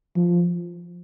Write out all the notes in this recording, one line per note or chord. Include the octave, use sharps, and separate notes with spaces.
F3